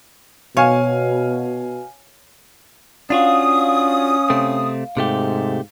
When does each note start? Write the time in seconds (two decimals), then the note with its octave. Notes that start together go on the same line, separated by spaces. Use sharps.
0.57 B2 C#5 F5 G#5
3.10 C#4 D4 F4 F#4 F5 D#6
4.30 C3 A3 C4
4.97 G#2 C3 A3 G4